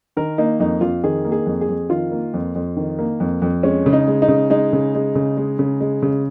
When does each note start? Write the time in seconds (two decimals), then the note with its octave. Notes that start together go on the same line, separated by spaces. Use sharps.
0.17 D#3 A#4
0.38 A#3 D#4
0.60 F2 D#4
0.81 F2 F4
1.03 D#3 G#4
1.25 A#3
1.32 G#4
1.46 F2
1.61 G#4
1.69 F2
1.89 D#3 F4
2.12 A#3
2.34 F2
2.56 F2
2.77 D#3
2.99 A#3
3.20 F2
3.42 F2
3.63 G#3 C#4
3.86 C#3
3.93 D#4
4.08 G#3
4.22 D#4
4.28 C#3
4.50 G#3 D#4
4.73 C#3
4.95 G#3
5.15 C#3
5.37 G#3
5.59 C#3
5.80 G#3
6.02 C#3